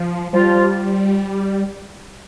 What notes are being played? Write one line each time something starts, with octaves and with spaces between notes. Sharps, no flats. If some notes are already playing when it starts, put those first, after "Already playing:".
Already playing: F3
F3 G3 F4